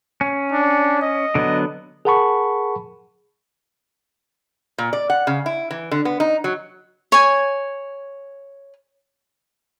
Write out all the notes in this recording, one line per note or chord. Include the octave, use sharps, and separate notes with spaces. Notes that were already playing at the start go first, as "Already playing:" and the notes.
C#4
D4
D#5
D3 F#3 B3
G#4 A#4 F#5 A5 B5 C#6
A#2
D5
F#5
C#3
E4
E3
D3
B3
D#4
F#3
C#5 G#5